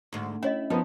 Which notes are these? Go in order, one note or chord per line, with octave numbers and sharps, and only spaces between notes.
D2 G#2
C#4 E4 C#5 D#5
F3 B3 D#4